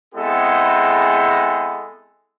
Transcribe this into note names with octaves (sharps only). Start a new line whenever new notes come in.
G#3 B3 C4 E4 G#4 A4